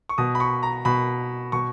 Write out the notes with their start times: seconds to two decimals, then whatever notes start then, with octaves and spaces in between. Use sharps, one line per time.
0.09 C#6
0.18 B2 D#6
0.35 B5
0.40 C#6
0.63 A#5
0.85 B2 B5
1.52 B2 C#6